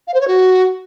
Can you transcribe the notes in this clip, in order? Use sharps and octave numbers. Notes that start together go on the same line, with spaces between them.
F5
C5
C#5
F#4